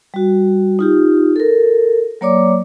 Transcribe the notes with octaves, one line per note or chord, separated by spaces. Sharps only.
G3 F#4
D#4 F4 G4
A4 A#4
F#3 A#3 C#5 D5 D6